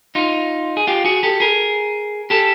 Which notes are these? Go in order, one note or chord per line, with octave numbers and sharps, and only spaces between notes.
D#4 F4
G#4
F4 G4
F#4 G#4
G4 A4
G#4 A#4
G4 A4